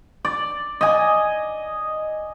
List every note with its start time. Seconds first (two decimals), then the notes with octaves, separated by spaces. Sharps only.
0.25 D5
0.81 D#5 G#5